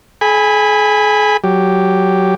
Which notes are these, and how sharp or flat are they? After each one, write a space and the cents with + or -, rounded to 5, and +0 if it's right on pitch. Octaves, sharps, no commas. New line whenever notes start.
G#4 +45 G#5 -20 B5 +0
F#3 +0 G4 +0